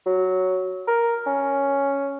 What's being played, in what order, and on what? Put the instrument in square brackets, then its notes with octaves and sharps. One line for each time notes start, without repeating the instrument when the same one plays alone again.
[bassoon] F#3
A#4
C#4